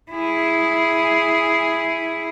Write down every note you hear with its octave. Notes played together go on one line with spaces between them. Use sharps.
E4 G#4